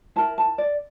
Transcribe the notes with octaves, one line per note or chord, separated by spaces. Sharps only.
E4 A#4 A5
A5
D5